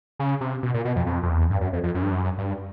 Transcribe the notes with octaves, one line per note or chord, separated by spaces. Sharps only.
C#3
C3
B2
A#2
B2
F2
F2
F2
E2
G2
F#2
F2
F2
F#2
G2
F#2
G2